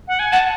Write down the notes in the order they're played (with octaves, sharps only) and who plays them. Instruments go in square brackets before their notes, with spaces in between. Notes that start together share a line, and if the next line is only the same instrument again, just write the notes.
[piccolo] F#5
G#5
[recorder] F#5 [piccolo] A5